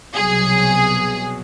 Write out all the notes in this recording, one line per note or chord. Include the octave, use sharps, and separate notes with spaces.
C2 B2 F#3 G#4